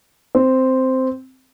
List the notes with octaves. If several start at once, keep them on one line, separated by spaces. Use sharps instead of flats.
C4